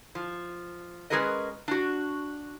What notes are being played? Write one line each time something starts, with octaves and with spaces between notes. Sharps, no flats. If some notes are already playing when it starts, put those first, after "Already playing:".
F3
G#3 C#4 G#4 A#4 B4 D#5
D4 F#4